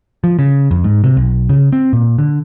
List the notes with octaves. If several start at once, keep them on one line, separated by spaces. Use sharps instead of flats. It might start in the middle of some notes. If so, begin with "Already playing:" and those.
F3
C#3
F2
G#2
C3
B1
C#3
C4
A#2
D3